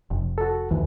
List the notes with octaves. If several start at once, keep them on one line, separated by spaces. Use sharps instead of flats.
F1
F#4 A4
D#2 E3